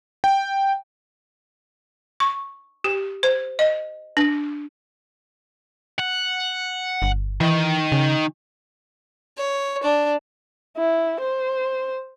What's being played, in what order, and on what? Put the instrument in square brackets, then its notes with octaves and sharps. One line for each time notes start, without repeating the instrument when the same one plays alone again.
[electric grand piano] G5
[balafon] C#6
G4
C5
D#5
D4
[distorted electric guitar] F#5
[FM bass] G1
[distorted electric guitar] D#3 [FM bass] E3
[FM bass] C#3
[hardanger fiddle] C#5
D4
[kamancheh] E4
C5